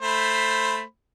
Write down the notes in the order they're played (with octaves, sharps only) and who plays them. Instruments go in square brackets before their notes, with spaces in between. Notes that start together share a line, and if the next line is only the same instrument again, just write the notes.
[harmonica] A3 C5 B5